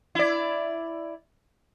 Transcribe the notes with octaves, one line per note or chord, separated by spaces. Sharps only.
E4 D5